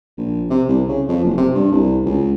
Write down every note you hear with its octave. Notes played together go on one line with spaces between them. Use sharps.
A#1
C3
C2
C#3
F2
F#1
C3
G2
C2
C#2